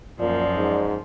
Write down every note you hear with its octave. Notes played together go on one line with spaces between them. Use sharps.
F#2 A#2 F3 D5
G#2